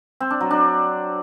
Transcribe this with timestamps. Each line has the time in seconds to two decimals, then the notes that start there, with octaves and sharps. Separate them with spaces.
0.20 C4
0.31 D4
0.41 F#3
0.51 D4